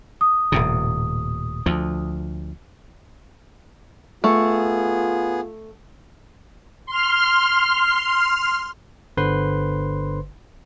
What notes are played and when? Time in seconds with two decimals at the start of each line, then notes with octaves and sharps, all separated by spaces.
0.21 D#6
0.52 D#1 A2 C3
1.66 D2 F3
4.24 A3 B3 F4 G#4
6.86 C6 F6
9.17 G1 D3 B4 C5 C6